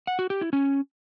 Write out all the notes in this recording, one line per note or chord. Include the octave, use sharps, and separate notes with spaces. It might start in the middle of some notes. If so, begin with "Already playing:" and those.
F#5
F#4
G4
E4
C#4